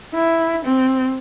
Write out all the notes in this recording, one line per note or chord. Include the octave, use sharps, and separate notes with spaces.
E4
C4